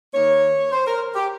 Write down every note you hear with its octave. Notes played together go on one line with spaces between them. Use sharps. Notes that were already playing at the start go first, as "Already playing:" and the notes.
D#3 A#3 D#4 C#5
C5
A#4
G4